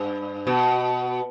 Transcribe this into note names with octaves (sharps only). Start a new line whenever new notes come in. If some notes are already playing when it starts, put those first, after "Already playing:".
Already playing: G2
B2